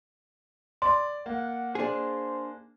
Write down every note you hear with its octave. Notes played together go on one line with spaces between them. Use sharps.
D5 C6
A#3 F#5
D4 G#4 C5